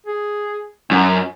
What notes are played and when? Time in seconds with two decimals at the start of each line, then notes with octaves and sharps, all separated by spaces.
0.06 G#4
0.91 F#2 C#4